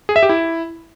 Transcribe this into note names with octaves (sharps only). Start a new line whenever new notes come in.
G#4
E5
G4
E4